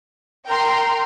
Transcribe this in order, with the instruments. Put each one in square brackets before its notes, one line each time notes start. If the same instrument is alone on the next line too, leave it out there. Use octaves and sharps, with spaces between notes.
[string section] A#4 G5 A#5 C6